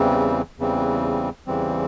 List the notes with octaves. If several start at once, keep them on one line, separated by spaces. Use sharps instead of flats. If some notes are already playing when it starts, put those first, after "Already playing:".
Already playing: E2 C#3 E3 G3 C4
E2 C#3 E3 G3 C4
E2 C#3 E3 G3 C4